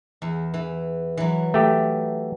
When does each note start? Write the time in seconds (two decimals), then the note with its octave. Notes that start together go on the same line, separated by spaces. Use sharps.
0.22 E2
0.54 E3
1.17 E3 F#3
1.54 A3 G4